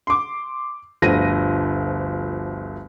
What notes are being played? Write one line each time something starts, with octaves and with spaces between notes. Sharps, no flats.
C6 D6
G1 D2 F3 A#6 D#7